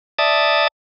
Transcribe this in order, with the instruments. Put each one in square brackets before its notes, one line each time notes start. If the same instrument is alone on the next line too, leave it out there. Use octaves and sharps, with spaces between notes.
[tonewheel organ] D5 E5 A5 D#6